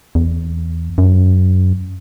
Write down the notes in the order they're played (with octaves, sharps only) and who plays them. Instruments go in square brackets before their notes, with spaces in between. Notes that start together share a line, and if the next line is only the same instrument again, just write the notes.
[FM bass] E2
F#2